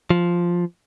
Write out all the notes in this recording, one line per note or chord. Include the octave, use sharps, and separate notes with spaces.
F3